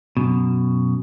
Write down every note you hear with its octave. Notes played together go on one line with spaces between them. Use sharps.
F#2 B2